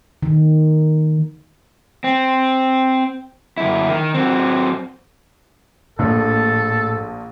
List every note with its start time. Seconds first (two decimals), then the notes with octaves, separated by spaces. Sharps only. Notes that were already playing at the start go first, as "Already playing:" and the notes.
0.23 D#3
2.04 C4
3.58 F#2 E4
3.89 D#3
4.14 F#3 C4
5.99 A#1 A2 A4